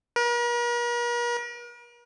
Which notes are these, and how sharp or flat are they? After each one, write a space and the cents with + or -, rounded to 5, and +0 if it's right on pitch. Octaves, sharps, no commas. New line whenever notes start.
A#4 +45